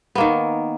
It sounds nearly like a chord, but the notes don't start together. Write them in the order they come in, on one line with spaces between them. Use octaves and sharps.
B3 A#3 D#3